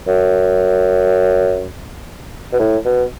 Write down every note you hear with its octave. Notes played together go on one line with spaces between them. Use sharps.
F#2
B2
A2
B2